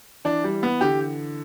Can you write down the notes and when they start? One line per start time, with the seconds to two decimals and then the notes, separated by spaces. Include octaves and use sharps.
0.25 E3 D4
0.44 G3
0.63 B3
0.81 D3 G4